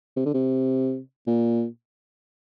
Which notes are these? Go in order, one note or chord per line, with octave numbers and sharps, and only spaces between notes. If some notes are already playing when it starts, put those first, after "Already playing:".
C3
D3
C3
A#2